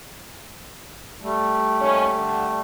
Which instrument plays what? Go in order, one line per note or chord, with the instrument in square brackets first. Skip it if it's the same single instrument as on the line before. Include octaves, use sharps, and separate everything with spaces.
[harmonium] G3 A3
[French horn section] D#2 C#4
D3